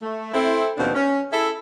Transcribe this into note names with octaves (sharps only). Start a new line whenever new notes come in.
A3
C4 E4 A4
D#2 B2 F3 B3 C4 D4
C#4
E4 G#4 A4 E5